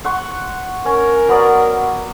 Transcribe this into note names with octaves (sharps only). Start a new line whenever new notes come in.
F#5 C6 C#6
C#4 A#4
F#3 B3 D5